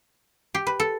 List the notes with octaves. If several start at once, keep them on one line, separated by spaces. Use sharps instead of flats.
G4
B4
A4